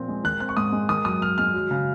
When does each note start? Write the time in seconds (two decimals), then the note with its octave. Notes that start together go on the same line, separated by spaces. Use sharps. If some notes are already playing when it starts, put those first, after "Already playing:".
Already playing: A#2 F3 C4
0.08 G#3
0.24 D#3 F#6
0.40 C4 F#6
0.49 C#6
0.57 G#2 D#6
0.72 G#3
0.89 D#3 D#6
1.05 F#2 D#6
1.21 F#2 F6
1.38 G#3 F6
1.54 F#3
1.71 C#3